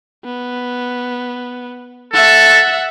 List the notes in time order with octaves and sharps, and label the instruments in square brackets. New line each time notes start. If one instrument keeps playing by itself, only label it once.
[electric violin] B3
[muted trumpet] A4 [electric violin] E5 F#5